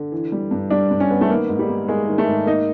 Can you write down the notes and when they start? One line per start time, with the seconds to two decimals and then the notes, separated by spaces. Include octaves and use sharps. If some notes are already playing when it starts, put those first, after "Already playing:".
Already playing: D3
0.12 E3
0.32 G3
0.51 G2
0.70 G3 D4
0.90 G2
1.00 C#4
1.10 B3
1.21 A3
1.30 D#3 A#3
1.49 G#2
1.59 G3
1.68 A#3
1.88 G#3 A#3
2.08 D#3
2.18 A3
2.27 G#2
2.46 A#3 D#4